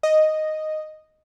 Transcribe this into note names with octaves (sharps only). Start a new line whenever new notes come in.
D#5